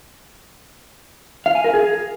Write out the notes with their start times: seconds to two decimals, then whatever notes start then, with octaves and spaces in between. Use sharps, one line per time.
1.46 F5
1.55 G#5
1.64 A#4
1.74 G#4